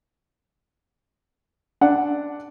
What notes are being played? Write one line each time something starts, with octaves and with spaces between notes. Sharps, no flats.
D4 F#5